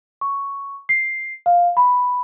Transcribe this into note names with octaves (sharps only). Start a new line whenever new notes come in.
C#6
C7
F5
B5